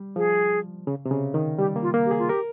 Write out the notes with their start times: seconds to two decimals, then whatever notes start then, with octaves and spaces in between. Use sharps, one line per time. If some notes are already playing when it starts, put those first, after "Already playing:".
Already playing: G3
0.16 F3 G#4
0.87 C#3
1.05 C3
1.11 C#3
1.34 D#3
1.58 G3 G4
1.76 A#3
1.82 F4
1.94 A#3
2.05 G4
2.11 G#4
2.19 F4
2.29 G4 A#4